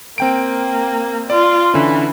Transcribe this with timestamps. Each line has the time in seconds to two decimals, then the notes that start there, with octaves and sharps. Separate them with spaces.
0.18 A#3 C4 G5 D7
1.30 F4 D5
1.74 D3 E3 C#4